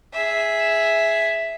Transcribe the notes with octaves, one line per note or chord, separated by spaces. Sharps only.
G#4 E5